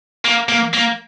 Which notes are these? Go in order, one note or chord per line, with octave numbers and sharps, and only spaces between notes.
A#3
A#3
A#3